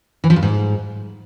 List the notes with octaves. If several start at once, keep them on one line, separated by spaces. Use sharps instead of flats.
E3
F3
G2
G#2